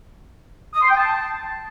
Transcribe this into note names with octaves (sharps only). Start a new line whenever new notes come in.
D#6
C6
G5
A5